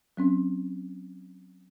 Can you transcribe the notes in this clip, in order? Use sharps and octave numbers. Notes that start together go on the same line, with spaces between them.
F#3 C4 C#4